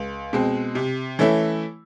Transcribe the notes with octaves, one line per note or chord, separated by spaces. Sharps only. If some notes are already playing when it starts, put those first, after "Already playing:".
Already playing: C#2
B2 G#3 C4
C3
E3 A3 C#4 E4